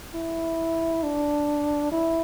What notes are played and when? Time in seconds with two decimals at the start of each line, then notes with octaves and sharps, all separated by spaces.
0.15 E4
1.03 D4
1.92 E4